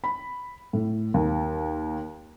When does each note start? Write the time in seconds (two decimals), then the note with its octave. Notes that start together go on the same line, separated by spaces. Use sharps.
0.04 B5
0.73 A2
1.14 D#2